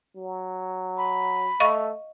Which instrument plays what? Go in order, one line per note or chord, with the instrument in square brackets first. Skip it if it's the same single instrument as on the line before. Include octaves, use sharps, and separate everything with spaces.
[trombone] F#3
[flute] B5
[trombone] A3 [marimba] D#5 F5 C#6